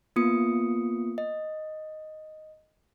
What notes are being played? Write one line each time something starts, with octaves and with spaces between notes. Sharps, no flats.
A#3 B3 F4 D#6 C#7
D#5